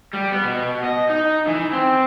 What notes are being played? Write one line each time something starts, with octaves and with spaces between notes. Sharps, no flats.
G3
B3
B2
D#5
D#4
E3
C4